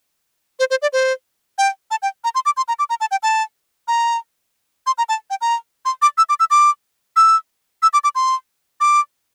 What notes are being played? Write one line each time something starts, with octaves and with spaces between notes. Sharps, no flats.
C5
C5
D5
C5
G5
A5
G5
A#5
C6
D6
C6
A#5
D6
A#5
A5
G5
A5
A#5
C6
A#5
A5
G5
A#5
C6
D6
E6
D6
E6
D6
E6
E6
D6
D6
C6
D6